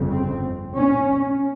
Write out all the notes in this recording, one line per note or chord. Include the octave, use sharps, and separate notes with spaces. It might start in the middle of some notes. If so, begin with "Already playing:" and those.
Already playing: G1 F2 C#3
C4
C#4